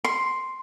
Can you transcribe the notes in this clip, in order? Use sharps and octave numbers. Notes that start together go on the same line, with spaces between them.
C6